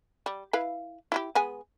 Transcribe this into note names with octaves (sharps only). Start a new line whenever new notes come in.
G3
E4 B4 F5
E4 F#4 G4
G#3 B3 G#5